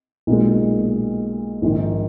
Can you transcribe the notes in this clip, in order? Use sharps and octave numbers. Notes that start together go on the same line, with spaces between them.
B1 A#2 G#3
A#1 G#2 D#3